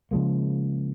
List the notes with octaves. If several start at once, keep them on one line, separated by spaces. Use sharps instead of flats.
C#3 F3 G#3 A#3